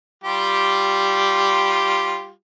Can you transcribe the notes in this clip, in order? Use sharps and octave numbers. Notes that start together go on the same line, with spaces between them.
G3 F4 G4